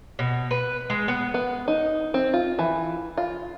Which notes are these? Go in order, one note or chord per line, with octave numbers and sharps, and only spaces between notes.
B2
B4
G#3
B3
B3
D#4
C4
F4
E3
F4